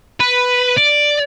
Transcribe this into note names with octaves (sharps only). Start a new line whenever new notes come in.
B4
D5